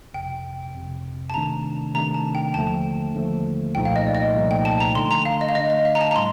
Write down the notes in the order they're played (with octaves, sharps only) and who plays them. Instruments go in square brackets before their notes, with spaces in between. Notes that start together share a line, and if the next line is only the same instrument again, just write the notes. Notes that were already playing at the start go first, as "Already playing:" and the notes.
[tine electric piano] G1 F2 C3 [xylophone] G5
[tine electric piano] G1 F2 C3
[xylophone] A5
[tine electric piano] C3 D#3 A3 D4 [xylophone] A#5
[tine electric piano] C3 D#3 A3 D4 [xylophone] A#5
[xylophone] A5
G5
[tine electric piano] D#2 D3 F3 A3 [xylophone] A5
[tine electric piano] D#2 D3 F3 A3
[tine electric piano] C2 A#2 F3 A3 D#4 [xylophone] G5
[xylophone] F5
D#5
D5
D#5
[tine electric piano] C2 A#2 F3 A3 D#4
[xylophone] G5
A5
A#5
[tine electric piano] D3 A3 D4 [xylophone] C6
[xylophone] A#5
F5
D#5
F5
[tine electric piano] D3 A3 D4 [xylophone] D#5
[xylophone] D#5
F5
A#5
A5
A#5
[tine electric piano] A2 G3 [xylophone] C6